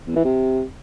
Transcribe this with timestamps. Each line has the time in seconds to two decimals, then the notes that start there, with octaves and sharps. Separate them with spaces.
0.07 E2
0.16 E3
0.25 C3